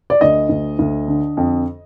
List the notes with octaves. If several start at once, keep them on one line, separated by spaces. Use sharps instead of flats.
D5
D2 D#5
D2
D2
D3
F2